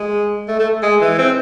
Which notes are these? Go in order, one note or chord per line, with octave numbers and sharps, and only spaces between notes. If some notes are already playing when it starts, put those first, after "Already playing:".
Already playing: G#3
A3
A3
G#3
E3
C4